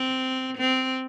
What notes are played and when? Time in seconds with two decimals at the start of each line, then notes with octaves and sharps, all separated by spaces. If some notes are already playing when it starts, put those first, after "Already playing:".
Already playing: C4
0.58 C4